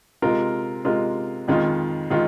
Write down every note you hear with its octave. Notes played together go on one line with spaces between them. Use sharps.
C3 G#3 F4 A#4
C3 G#3 F4 A#4
F2 D#3 G#3 F4
D#3 G#3 F4